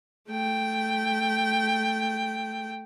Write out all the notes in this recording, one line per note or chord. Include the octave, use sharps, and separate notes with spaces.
A3 G5